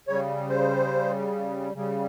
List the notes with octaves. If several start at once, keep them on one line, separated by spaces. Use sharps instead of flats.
C#3 G3 C#5
C5
C#3 G3